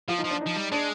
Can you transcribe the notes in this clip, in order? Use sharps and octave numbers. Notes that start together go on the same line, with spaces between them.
F3 F4
D#4
F3
D4
D#4
F3
G3
G#3 D4